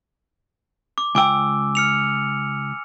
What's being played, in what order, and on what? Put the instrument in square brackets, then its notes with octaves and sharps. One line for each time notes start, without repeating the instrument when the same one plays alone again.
[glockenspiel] D6
[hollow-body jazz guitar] C#2 G5 [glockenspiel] G#5 D6 E6
[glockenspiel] F6 C#7 F7